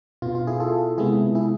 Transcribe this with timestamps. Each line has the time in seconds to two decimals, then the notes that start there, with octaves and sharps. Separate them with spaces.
0.22 B2 B3 F4
0.35 F4
0.47 E4 G#4
0.60 F4 A4
0.98 C3 G#3 B3 E4 G#4
1.35 E4 G#4